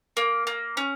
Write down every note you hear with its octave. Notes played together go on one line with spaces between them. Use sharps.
A#3
A#3
C#4